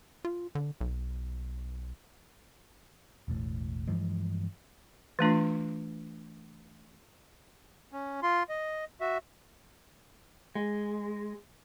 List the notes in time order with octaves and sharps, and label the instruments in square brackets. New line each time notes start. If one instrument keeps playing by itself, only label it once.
[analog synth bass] F4
D3
B1
[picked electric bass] E1 A1 A2
G2 E3 F3 G#3
[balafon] E3 A3 D4 F4
[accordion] C#4
F4 C6
D#5
F#4 E5
[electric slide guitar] G#3